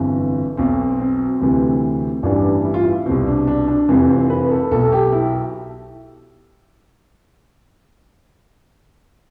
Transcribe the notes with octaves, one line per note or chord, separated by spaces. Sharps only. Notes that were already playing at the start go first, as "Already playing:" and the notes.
Already playing: G1 F2 E3
B1 B2 C4
C4
D2 C3 E3
A1 G2 E3 D4
E4
F4
E4
C2 B2 C4
D4
D4
D4
F1 F2 E3 C4
C4
B4
A4
B1 B2 A4
G4
E4